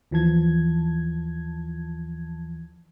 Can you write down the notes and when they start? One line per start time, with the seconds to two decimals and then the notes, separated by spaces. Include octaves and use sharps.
0.11 D#2 E3 F3 A5 G#6